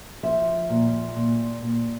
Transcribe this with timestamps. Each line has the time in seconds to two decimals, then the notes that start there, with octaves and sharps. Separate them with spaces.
0.23 F3 E5
0.69 A#2
1.16 A#2
1.62 A#2